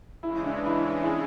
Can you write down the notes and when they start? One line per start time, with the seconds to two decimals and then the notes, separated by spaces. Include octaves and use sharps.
0.23 C#3 E3 G#3 E4
0.44 D4
0.66 E4
1.03 E4 G#4